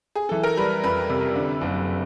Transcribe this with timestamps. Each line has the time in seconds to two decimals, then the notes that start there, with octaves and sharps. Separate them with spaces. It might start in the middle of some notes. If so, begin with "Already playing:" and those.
0.15 G#4
0.29 E3 A4
0.43 A#4
0.57 G3 B4
0.84 F2 B4
1.10 C3
1.36 D3
1.61 F#1